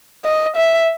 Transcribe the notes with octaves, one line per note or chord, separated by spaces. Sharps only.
D#5
E5